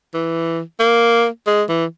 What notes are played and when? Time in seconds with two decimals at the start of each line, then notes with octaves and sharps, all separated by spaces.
0.14 E3
0.80 A#3
1.47 G#3
1.69 E3